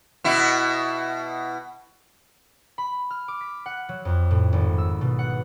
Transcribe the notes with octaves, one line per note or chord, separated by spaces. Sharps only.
B2 E4
B5
F6
D6
B6
F#5
F#3
F2
A2
G#1
E6
B2
F#5